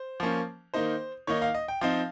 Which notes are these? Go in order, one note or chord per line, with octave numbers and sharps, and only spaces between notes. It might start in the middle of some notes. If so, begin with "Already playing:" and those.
Already playing: C5
F3 A#3 C#4
D#3 A#3 D#4 C5
D#3 A#3 D#4 C#5
F5
D#5
G5
F3 C4 D#4 F5